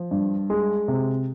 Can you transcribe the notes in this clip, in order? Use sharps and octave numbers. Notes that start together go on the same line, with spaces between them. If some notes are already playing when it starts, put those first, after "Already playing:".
Already playing: F3
G2
G#3
C3